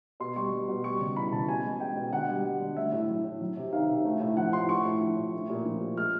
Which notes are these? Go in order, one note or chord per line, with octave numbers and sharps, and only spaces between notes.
B2 C6
G3 C#6
G3
B2
G3 C#6
C#3
E3 B5
C#3 A5
B2 G#5
G#3
G#3 G5
B2
D3 F#5
G3
G3
D3
A3 E5
A2
F#3
A2
F#3
C3
D#3 F5
C3
A3
A2
F3 F#5
A2 C6
A3 C#6
A2
F3
A2
A3
A#2
F3
A#2
G#3 F6